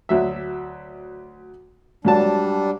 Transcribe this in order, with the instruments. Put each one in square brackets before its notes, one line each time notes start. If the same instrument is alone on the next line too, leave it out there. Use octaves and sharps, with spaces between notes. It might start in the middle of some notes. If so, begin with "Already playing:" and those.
[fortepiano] D2 F#3 E5
[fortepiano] G#2 F#3 A5 [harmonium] G3 D4